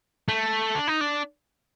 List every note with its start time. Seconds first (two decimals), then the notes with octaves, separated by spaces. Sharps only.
0.28 A3
0.75 D4
0.87 D#4
1.01 D4